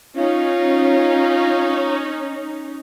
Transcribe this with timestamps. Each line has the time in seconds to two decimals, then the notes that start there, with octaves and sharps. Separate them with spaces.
0.16 C#4 D#4 F4